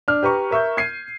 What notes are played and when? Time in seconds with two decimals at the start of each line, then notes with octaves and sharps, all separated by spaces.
0.08 D4 F6
0.23 G4 B4 A#5 C#6
0.51 A#4 E5 C#6 G6
0.77 G#6 C7 D#7